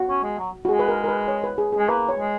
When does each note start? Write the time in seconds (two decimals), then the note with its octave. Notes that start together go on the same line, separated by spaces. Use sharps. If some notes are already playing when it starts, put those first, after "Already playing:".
Already playing: F#4
0.09 C#4
0.24 G#3
0.39 F#3
0.65 F#4
0.69 G#3 G#4
0.79 B4
0.88 A#4
1.04 A#4
1.09 B4
1.28 C#5
1.44 B4
1.58 G#4
1.73 G#4
1.78 G#3
1.89 A#3 B4
2.09 C#5
2.18 G#3